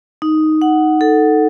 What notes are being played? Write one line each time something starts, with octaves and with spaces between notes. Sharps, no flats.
D#4
F#5
A4